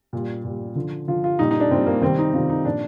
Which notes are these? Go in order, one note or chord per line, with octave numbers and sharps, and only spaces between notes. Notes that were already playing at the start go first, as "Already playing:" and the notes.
A#2 G3
A#2 G3
D3 F3
D3 F3 F4
F4
A#2 G3 D#4
D#4
D4
A#2 G3 C4
A#3
C3 D#3 G3 C4
D#4
C3 D#3 G3 F4
D#4
A#2 F3 D4